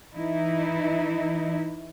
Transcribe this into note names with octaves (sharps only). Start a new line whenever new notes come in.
E3 D#4 E4